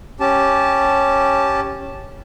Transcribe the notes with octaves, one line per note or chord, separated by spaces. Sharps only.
C#4 G4 A5